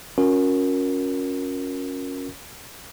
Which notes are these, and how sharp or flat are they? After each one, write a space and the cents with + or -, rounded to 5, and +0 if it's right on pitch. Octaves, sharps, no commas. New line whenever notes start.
C#4 +0 F#4 -40 A#4 +0